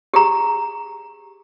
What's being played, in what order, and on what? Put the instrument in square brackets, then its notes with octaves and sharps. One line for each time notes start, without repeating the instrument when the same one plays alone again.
[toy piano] G4 G#4 A#5